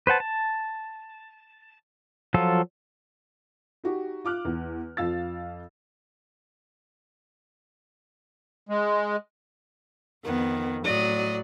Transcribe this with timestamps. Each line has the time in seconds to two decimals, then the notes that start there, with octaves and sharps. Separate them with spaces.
0.07 B4 C5 F#5 A5
0.20 A5
2.34 F3 F#3 F4 A4
3.84 D#4 F#4 G4
4.25 F4 D6 F6 F#6
4.45 E2
4.97 F2 F3 F5 E6 A6
8.69 G#3
10.25 F2 D#3 B3
10.85 A2 F#3 D5 D#5